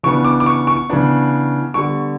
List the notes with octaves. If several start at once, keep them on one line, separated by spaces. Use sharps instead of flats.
C#3 E3 B3 D4 C#6
D6
D6
C#6
C#6
C#3 E3 B3 D4
D3 G3 B3 C#6